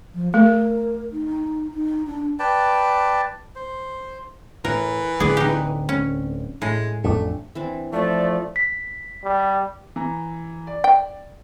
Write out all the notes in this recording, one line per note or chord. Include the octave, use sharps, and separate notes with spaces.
F3
A3 A#4
D#4
D#4
D4
B4 D5 G5 A5
C5
A2 E3 A#4
D1 D3 C4 G#4 D5
D#4 G4
C#4
A2 G#3
A1 F2 A3 D4
E3 C4 D4
F3 A3 D5
B6
G3
E3 A#5
D5
G5